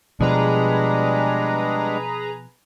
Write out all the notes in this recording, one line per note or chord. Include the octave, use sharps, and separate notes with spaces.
B2 F3 G3 G#3 D4 G#4 B4 A#5